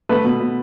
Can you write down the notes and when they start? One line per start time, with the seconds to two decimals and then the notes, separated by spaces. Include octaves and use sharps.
0.09 A3 B4
0.24 B2
0.40 B2